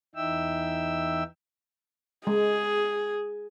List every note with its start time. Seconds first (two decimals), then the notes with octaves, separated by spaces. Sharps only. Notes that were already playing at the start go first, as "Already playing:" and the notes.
0.15 E2 E3 D#4 E5 G5 E6
2.27 G#3 G#4